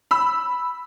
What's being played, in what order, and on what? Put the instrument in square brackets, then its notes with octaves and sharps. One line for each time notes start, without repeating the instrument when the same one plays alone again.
[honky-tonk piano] B5 E6